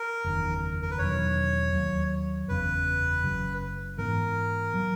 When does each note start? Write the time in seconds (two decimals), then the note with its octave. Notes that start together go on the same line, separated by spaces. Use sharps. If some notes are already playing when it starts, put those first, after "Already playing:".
Already playing: A#4
0.24 F#1 E2 D#3
0.82 A#4
0.91 B4
0.99 E1 E2 D#3 F#3 C#5
1.73 D#2 D#3 F#3 A#3
2.48 F#1 E2 C#3 B4
3.23 F#1 F#2 C#3 F#3
3.98 G#2 E3 B3 A#4
4.74 F#3 A#3